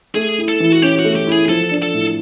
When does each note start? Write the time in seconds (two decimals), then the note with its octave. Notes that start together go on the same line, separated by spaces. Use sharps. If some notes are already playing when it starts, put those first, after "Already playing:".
0.15 A3 G#4
0.38 E4
0.48 A4
0.60 E3
0.72 F#4
0.82 C#4 G4
0.99 F#4
1.05 A3
1.16 G4
1.27 E4 G#4
1.49 F3 A4
1.71 D4
1.82 A4
1.94 A2